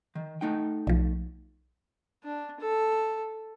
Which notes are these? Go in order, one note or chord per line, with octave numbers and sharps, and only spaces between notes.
D#3
A3 D#4 G5
B1 F3
D4
A4